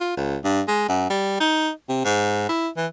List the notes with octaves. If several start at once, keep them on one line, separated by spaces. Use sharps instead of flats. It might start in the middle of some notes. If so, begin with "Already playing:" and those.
F4
C#2
G2
G#3
F#2
G3
D#4
C3
G#2
E4
E3